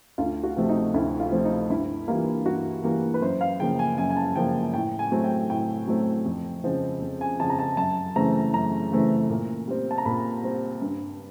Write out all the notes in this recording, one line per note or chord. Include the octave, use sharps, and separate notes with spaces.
D2 F4
F#4
C3 F3 A3 C4
D#4
D2 E4
F4
C3 F3 A3 C4
D#4
G2 E4
E3 G3 A#3 F4
G2 F#4
E3 G3 A#3
B4
F#2 C5
F5
C#3 F3 A#3 G5
G#5
F#2 G#5
G#5
A5
C#3 F3 A#3 G5
A2 G5
G#5
F#3 A3 C4
G5
A2 G5
F#3 A3 C4
F2
C#3 F3 G#3 C4
F2
G#5
C#3 F3 G#3 C4 A5
A#5
A5
F#2 A5
C#3 E3 A3 C4 A#5
F#2 A#5
C#3 E3 A3 C4
A#2
G3 C4
A5
A#5
A#2 B5
G3 C4
G2